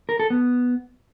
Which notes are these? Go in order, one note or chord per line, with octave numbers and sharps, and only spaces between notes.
A#4
A4
B3